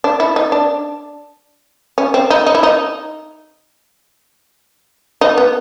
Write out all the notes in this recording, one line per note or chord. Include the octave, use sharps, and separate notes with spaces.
D4
E4
D#4
D4
C#4
C4
D#4
D#4
E4
D#4
D#4
B3